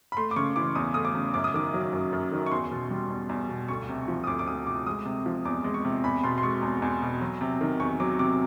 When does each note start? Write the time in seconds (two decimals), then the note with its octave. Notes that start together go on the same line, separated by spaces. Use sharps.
0.12 B5
0.17 A3 C6
0.31 D6
0.36 C#3 C#6
0.56 E3 D6
0.75 E2 D#6
0.94 A3 D#6
1.05 D6
1.15 C#3
1.34 F#2 D6
1.44 D#6
1.54 D#3 D6
1.74 F#3
1.93 F#2
2.13 F#2
2.32 D#3
2.46 C#6
2.52 E2 C6
2.71 B2
2.91 G3
3.10 E2
3.29 E2
3.49 B2
3.68 D2 C#6
3.89 C3
4.08 F3
4.24 D#6
4.27 D2 D6
4.39 D6
4.47 D2 D#6
4.67 C3 D6
4.87 G#3 D#6
5.05 C3
5.26 F3
5.45 E2 D6
5.64 G#3
5.74 C#6
5.85 C3
6.04 E2 B5
6.24 B2 C6
6.38 C6
6.43 G#3 C#6
6.62 E2
6.82 E2
7.02 B2
7.21 F#3
7.41 C3
7.61 D#3
7.79 E2 C#6
8.00 F#3 D6
8.19 C3 D6